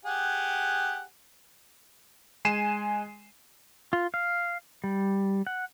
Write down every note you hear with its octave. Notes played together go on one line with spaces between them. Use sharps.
G4 G#4 F#5
G#3 G#5 C7 D#7 E7
F4
F5
G3
F#5